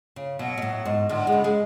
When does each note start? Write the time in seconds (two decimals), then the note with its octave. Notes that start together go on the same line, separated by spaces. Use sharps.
0.16 C#3
0.39 B2 F#3
0.57 B2
0.62 A2
0.85 G#2
1.09 A2 D3
1.27 G#3
1.32 C#3
1.44 G#3